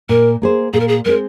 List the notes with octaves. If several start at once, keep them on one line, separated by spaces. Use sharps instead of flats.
A#2 A#4
A#3 G#4 C5
A#2 G#4
A#4
G#4
G#3 C4 G#4 A#4 C5